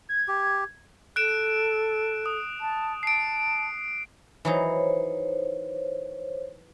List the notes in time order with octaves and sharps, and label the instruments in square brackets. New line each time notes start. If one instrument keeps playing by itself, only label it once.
[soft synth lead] G#6
[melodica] G4
[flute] A4 [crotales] F#6 D7 E7
[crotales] D#6
[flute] A5
[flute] A5 [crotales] C7 D7
[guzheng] E3 F#3 D#4 [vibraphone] C5 C#5